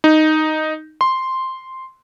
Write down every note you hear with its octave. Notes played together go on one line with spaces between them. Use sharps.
D#4
C6